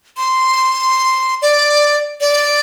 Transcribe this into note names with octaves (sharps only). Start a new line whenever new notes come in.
C6
D5
D5